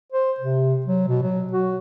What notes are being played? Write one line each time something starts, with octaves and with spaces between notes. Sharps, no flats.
C5
C3
F#3
B2
F#3
F#4